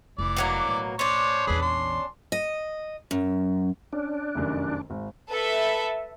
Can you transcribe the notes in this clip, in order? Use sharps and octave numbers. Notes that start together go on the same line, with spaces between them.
F1 E3 D5
B2 F#3 A#3
A2
C#4 D4 C5 C#5
A#1 E2 G#4 B4
C6
D#5
F#2
C#4 D4
F1 F#2 D#3
G#1
A4 B4 E5